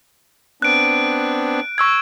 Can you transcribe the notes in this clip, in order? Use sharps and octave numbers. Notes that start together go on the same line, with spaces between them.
B3 C4 D4 F#6 D7
C#6 E6 G#6